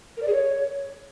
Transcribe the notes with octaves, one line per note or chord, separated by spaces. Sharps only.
A#4
D5
G#4
C#5